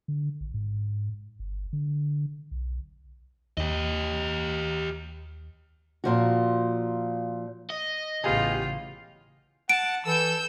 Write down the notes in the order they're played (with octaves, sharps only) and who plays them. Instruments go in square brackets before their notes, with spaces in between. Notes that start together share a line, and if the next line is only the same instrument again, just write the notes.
[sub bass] D3
A1
G#2
G1
D3
B1
[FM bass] D#2 [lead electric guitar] G4 D#5
[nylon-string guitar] A#2 F3 F#4
[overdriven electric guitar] D#5
[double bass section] A1 C#3 [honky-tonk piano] B3 G4 G#4 [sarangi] F4
[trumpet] F#5 [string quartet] A5 [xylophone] D7
[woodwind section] E3 [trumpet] A4 [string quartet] E6 G6